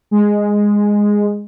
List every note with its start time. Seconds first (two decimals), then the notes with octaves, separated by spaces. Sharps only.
0.11 G#3